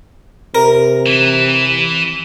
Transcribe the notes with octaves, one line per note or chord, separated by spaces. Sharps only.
C3 A#4
E3